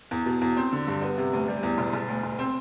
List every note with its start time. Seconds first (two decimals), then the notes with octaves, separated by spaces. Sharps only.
0.11 E2
0.26 B2
0.41 E2
0.57 C4
0.72 D3
0.87 G2
1.02 B3
1.18 C3
1.33 D2
1.48 G3
1.63 E2
1.78 E1
1.93 E1
2.08 D2
2.23 E1
2.39 C4